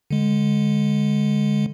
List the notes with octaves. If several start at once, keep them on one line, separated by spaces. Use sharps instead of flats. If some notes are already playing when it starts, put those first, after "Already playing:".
D3 G#3